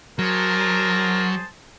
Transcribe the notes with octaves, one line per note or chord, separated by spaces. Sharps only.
F#3 G#4 A#4 C5 A5